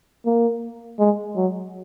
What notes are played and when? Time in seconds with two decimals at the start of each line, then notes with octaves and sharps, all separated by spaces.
0.26 A#3
0.99 G#3
1.36 F#3